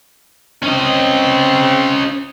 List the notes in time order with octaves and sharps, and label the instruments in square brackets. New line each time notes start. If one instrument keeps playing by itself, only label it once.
[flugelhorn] C4 [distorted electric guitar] C#4 D#5